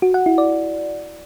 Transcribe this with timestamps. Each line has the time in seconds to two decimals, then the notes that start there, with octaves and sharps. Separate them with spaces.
0.02 F#4
0.14 F#5
0.26 E4
0.38 D5